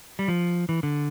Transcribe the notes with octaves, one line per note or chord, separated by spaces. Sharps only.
G3
F3
E3
D3